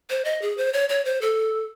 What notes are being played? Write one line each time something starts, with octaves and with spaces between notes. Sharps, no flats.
C5
D#5
G#4
C5
C#5
C#5
C5
A4